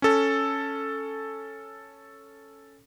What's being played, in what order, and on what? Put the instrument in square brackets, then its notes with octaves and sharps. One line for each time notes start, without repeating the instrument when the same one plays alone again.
[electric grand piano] C#4 A4